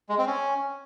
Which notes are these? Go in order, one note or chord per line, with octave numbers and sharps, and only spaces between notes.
G#3
C4
C#4